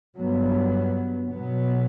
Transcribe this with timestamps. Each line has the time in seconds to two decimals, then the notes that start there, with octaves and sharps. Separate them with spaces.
0.17 G2 F#3 B3
1.31 B2 F#3 B3